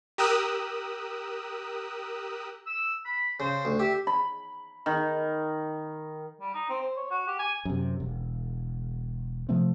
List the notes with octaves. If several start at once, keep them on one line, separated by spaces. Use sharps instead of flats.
G4 A#4 D#6 E6 F#6
E6
B5
C#3 C5
D2
G4 E5
B5
D#3
G3
D#4
C4
C5
C#5
F#4
G4
G#5
F#2 C3
E1
C3 F3 A3 C4